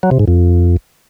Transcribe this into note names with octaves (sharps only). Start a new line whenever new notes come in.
F#3
C3
G#2
F2